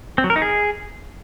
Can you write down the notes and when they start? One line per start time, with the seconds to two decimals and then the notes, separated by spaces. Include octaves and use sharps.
0.18 C4
0.24 F#3
0.30 A#4
0.36 D#4
0.42 G#4